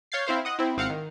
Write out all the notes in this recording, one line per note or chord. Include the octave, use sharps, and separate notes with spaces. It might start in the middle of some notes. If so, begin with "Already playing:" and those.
C#5 F5 G6 A6 C7
C4 E4 C5 F5
D#5 F#5 D#6
C4 E4
G#1 C4 F5 F#5 C#7
D#3